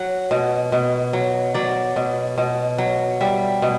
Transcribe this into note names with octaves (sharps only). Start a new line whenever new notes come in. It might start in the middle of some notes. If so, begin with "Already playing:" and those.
Already playing: F#3 F#5
B2
B2
F#3
F#3 D5
B2
B2
F#3
G3 E5
B2